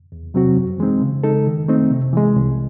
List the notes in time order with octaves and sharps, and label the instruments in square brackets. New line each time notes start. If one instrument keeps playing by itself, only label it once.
[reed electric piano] E2
C3 F#3 C4 F#4
F#2
E3 G#3 C4 D#4
C#3
G#3 D#4 A4
D#3
A3 C4 D#4
C3
E3 G#3
C2